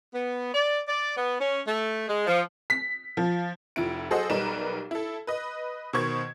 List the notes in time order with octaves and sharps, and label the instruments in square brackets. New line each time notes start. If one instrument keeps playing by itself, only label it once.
[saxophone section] B3
D5
D5
B3
C#4
A3
G#3
F3
[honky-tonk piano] B6
F3
F1 F3 E4 D7
F#3 G#4 A4 C5 D#5 F#5
B1 G3 D#4 A#4 B4 E7
E4 A4
B4 D#5
B2 D#3 C5 C#6 G#6